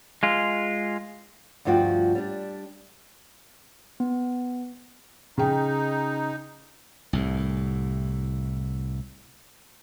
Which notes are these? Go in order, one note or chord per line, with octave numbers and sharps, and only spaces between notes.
G#3 F4
D2 G2 F3 F4 F#4 G5
G3 D4
B3
C#3 D#4 G5
C2 A2